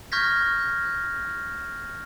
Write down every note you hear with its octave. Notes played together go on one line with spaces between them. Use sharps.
C#6 F6 G6 G#6 A#6 B6